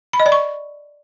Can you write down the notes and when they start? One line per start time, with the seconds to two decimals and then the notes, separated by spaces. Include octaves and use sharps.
0.13 B5
0.20 D#5
0.26 D5
0.32 C#6